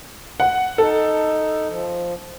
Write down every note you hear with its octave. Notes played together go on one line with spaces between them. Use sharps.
F#5
D#4 A4
F3